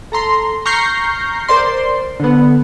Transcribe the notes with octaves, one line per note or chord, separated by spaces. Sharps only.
A4 A#5 C6
A#5 C#6 F6 G6 A#6 C7
A#4 C5 D5 C6
D3 B3